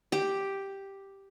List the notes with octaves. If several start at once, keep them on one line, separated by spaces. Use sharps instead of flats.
G4